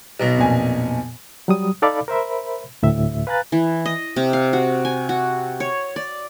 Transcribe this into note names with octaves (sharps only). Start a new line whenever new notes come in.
B1 B2
F2 A#2 G#5
F#3 G3 D#6
D#4 A4 D5 F5 B5 D6
A#4 C5 E5 B5
D2 A2 E5
B4 F5 G#5 A#5 F#6 A6
E3
D#5
C3
F5
F#4
G#5
F#4
C#5
D5